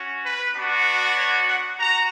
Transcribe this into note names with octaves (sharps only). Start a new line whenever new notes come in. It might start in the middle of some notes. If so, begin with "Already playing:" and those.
Already playing: C#4 F#4
B4
B3 D4 F#4
C#5
F#5
F#4 A#5